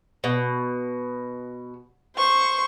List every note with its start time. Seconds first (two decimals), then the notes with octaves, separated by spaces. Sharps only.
0.24 B2
2.16 C5 C#6